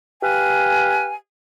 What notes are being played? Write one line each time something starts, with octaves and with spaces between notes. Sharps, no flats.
G4 B4 F5 G#5